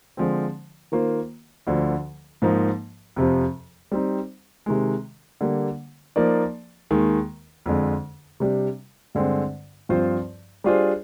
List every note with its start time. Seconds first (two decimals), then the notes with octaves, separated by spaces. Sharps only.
0.17 D3 F3 G#3 C4
0.92 D#3 A#3 F4 C5
1.67 D2 D3 F3
2.42 G#2 F3 A#3 D#4
3.16 F2 C3 F3
3.92 G3 C4 D#4
4.66 C3 D#3 G#3
5.41 D3 G3 A#3
6.16 F3 A#3 D#4 A#4 D5
6.91 D#2 D#3 G#3
7.66 F2 D3 G#3
8.40 C3 G3 D4
9.15 G2 D3 G#3 C4
9.89 G2 F3 C4 F4 C5
10.64 G3 D4 F4 G#4 C5